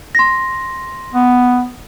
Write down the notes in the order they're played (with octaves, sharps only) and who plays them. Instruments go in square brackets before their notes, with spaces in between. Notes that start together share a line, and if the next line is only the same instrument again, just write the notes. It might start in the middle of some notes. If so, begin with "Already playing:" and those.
[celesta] C6 A#6
[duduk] B3